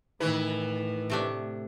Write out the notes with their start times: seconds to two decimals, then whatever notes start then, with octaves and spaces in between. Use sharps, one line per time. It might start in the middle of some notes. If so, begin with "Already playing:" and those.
0.20 A2 D#3 E3 B4
1.10 C3 A3 D4